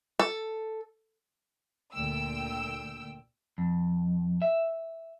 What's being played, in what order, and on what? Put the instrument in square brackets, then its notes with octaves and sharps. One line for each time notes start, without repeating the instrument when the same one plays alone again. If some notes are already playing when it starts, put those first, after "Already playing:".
[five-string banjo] A4
[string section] D2 A#2 G5 E6
[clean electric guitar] F2
E5